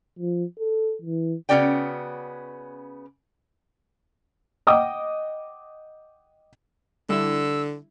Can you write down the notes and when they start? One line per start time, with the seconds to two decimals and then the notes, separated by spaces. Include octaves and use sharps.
0.19 F3
0.59 A4
1.02 E3
1.49 C#3 B3 C#4 F#4 D5 G5
4.67 D#5 F#5 G5 D6 D#6
7.09 D3 G3 D4 E4 E6